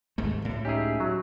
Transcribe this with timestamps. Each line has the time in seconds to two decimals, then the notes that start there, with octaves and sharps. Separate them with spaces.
0.18 D#2 G#2 A3
0.42 C#2 A2
0.65 C#4 D#4 G4 G#4 E5
1.00 F#3